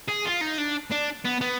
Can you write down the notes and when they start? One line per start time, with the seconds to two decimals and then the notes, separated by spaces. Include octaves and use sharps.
0.08 G#4
0.25 F4
0.41 D#4
0.58 D4
0.91 D4
1.25 B3
1.41 B3